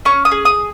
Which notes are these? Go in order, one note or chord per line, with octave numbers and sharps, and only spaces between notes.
C#4 C#6
D#6
G#4
D#6